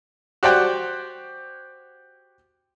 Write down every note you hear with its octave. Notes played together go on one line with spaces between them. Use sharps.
F#4 G4 C5 D5 F#5 G5